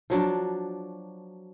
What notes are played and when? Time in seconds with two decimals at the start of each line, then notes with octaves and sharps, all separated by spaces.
0.10 F3 F#3 D4